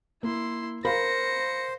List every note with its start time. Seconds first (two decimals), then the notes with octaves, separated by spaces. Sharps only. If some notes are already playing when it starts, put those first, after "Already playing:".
0.23 A#3 E4 C6
0.85 A#4 C5 F5 B5 A#6 C#7